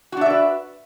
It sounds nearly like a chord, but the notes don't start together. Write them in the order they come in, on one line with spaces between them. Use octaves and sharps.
F#4 D4 E5 D5 B4